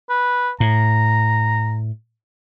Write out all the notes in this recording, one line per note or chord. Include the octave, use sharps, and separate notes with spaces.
B4
A2 A#5